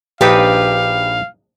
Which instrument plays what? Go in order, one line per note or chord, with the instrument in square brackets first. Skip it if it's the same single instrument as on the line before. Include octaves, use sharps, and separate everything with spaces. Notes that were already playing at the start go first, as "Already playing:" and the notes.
[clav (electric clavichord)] A#1 D4 D#4 [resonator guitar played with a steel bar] G4 B4 [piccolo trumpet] F5